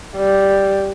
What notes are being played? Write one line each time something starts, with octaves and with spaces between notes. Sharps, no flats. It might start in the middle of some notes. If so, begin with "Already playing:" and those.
G3